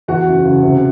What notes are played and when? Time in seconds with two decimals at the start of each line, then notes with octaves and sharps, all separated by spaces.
0.08 E2 F#4 F#5
0.27 F#1
0.45 C#3
0.63 C3